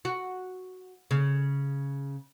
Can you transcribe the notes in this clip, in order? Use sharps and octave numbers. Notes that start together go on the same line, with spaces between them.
F#4
C#3